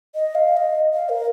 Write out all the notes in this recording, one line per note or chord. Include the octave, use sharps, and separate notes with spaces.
D#5
F5
D#5
F5
A#4